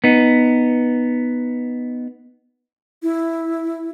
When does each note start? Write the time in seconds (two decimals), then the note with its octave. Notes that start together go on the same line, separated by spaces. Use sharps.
0.04 B3 D#4
3.03 E4